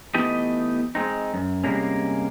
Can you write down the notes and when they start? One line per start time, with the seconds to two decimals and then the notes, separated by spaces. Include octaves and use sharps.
0.14 E3 A3 B3 D#4 G4 D#5
0.95 G#3 C4 D#4
1.34 F#2
1.64 C3 G3 G#3 A#3 C#4